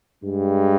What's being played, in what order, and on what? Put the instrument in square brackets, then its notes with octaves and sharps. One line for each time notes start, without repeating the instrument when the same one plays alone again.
[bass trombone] G2 [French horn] G#3